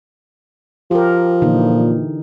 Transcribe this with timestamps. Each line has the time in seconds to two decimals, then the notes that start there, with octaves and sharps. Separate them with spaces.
0.91 F3 G4 A#4
1.42 A#2 D3 E3 D#4